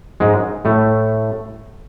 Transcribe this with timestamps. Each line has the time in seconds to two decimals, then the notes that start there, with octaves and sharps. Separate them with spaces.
0.20 G#2 G#3
0.65 A2 A3